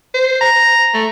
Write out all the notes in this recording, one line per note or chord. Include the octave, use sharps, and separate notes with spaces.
C5
A#5
A3